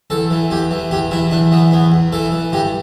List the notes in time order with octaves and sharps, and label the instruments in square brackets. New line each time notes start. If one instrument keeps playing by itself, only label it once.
[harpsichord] E2 A4
E3
E2 G4
E3
E2 G4
E3 E4
E2 D4
E3 B3
E2 B3
E2
E3 A4
E3
G2 G4